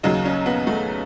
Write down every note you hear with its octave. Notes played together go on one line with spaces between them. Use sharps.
D#2 C#3 F#3 D#4
C#4
B3
A3